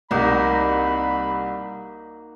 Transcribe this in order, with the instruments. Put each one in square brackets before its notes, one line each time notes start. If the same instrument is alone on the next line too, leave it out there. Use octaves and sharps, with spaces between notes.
[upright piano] C2 [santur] A#3 D#4 F#4 [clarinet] B5